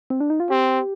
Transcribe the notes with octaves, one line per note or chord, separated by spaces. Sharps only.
C4
D4
D#4
F4
C4 G4